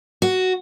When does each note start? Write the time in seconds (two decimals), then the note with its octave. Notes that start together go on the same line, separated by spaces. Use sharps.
0.22 F#4